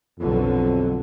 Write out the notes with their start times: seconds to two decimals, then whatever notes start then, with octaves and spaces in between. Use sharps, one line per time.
0.19 B1 F2 D3 F#3